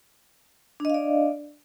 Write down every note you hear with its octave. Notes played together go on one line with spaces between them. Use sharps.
D4 D5 D#5 F5